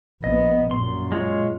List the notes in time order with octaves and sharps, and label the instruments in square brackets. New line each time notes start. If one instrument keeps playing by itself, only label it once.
[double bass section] A#1 B3 [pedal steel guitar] D#5
[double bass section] F#2 A#2 [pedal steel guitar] C6
[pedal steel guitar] G#3 F4 C#5